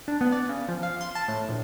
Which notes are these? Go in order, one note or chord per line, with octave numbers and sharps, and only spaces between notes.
D4
B3
D5
C#3
F3
F5
C6
A5
A2
A#1